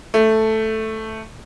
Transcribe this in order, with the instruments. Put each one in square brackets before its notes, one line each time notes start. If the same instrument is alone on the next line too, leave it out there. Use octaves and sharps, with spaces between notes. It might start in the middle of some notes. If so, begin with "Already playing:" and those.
[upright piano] A3